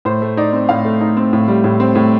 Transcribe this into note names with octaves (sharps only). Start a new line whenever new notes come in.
A2 C5
A3
D#4 D5
C4
A2 F5
A3
D#4
C4
A2
G3
A2
C4
A2